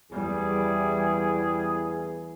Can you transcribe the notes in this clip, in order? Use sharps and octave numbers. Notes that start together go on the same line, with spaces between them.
E2 E3 G3 G#4